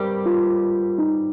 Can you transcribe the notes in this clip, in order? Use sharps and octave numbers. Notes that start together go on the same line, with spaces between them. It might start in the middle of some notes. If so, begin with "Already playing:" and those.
Already playing: G2 G3 C4 G4 A#4
F4
D#4